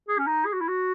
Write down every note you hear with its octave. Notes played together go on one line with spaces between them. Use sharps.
G#4
C#4
D#4
G#4
F#4
E4
F#4